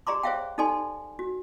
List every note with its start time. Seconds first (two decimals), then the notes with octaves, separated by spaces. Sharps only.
0.07 G4 G#4 D5 A#5 C6 D6
0.23 G#4 C5 C#5 E5 F5 G5
0.58 D#4 G4 A4 D5 G#5 C6
1.19 F#4